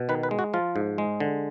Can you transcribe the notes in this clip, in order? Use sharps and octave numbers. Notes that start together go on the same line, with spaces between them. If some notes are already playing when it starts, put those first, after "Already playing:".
Already playing: B2
D#3 B4
B4
G#3
F#4
F3 F4
G#2
G#3
D3